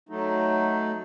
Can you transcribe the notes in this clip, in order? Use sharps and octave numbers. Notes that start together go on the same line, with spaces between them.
F#3 A3 D#4